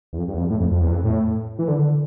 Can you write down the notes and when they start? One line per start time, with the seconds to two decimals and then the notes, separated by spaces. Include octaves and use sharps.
0.13 E2
0.18 F2
0.28 G2
0.34 E2
0.39 F2
0.50 A2
0.60 F2
0.71 F2
0.81 E2
0.91 F2
1.04 A2
1.59 E3
1.68 D3
1.79 D3